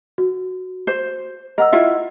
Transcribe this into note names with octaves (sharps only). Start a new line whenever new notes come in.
F#4
C5
A#4 D#5 F#5 E6
E4 F4 E5